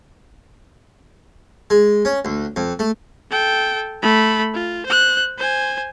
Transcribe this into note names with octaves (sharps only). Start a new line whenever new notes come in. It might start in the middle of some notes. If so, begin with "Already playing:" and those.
G#3
C#4
D2
F2
A3
A4 G5
A3 B5
F4
C5 F#6
C5 G#5